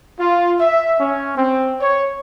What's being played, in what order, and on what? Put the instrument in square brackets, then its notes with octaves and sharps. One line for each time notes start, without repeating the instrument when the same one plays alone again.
[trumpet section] F4
E5
C#4
C4
C#5